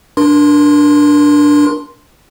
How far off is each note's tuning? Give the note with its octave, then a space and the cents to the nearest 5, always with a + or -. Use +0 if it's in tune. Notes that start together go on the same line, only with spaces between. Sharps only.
D4 +0 A#4 +35 C6 +0